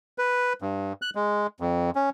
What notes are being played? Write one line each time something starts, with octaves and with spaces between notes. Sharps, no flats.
B4
G2
F#6
G#3
F2
C#4